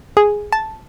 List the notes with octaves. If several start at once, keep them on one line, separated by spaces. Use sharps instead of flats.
G#4
A5